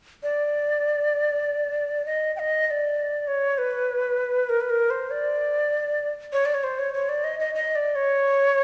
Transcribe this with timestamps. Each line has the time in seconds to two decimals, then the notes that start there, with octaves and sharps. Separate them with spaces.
0.23 D5
2.06 D#5
2.36 G5
2.39 D#5
2.67 D#5
2.70 D5
3.27 C#5
3.58 B4
4.49 A#4
4.61 B4
4.70 A#4
4.90 C5
5.11 D5
6.33 C#5
6.45 D5
6.54 C#5
6.64 C5
6.79 C#5
6.94 C#5
7.09 D5
7.24 D#5
7.40 D#5
7.55 D#5
7.75 D5
7.95 C#5